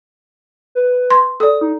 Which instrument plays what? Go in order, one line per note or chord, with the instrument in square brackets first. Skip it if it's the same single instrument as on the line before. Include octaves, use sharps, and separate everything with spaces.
[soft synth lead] B4
[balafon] C6
[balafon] A4 D5 [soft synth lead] D#6
[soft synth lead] D#4